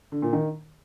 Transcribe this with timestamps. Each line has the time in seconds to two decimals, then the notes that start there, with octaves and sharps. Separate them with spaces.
0.12 D3
0.22 A#2
0.33 D#3